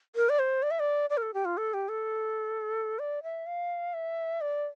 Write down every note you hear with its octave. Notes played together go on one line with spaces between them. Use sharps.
A#4
D5
C5
D5
E5
D5
D5
A#4
A4
G4
F4
A4
G4
A4
D5
E5
F5
E5
D5